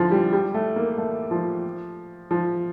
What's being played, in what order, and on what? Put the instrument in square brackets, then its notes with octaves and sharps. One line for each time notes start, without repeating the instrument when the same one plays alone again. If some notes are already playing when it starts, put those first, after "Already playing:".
Already playing: [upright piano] D3 E3 F3
G3
G3
A3
A#3
A3
F3
F3